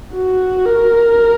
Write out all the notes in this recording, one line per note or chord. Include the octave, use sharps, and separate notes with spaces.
F#4
A#4